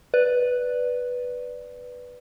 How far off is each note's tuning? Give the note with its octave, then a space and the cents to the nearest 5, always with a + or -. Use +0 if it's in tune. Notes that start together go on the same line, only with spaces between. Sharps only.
B4 +0 D5 +0